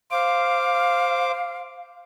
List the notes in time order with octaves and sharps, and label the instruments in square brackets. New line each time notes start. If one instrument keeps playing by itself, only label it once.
[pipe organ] C5 D6 [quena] F5